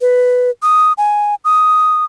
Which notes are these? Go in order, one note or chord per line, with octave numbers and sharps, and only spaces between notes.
B4
D#6
G#5
D#6